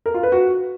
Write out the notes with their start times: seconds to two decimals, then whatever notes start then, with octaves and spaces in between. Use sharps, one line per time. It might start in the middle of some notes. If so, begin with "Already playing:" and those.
0.06 A#4
0.14 F4
0.23 B4
0.32 F#4